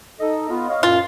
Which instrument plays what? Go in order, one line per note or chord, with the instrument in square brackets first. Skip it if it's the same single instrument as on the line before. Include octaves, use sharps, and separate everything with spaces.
[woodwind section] D#4 A4 D#5
B3 F4 D#5
C#5 D#5 F5
[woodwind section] F#2 A#2 [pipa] F4